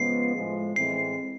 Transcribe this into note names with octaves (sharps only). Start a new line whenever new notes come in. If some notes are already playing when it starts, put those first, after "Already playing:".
Already playing: C#3 F3 G#3 B3 C7
A2 F3 G#3
A2 E3 G#3 C4 C7